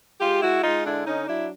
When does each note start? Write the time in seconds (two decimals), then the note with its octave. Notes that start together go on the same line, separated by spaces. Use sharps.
0.20 G#3 F4 G4
0.42 G#3 E4 F#4
0.63 G#3 D#4 F4
0.84 D3 D4 E4
1.06 D3 C#4 D#4
1.27 F#3 D4 E4